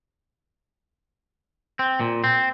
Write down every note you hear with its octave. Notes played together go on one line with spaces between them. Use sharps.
C4
A#2
C4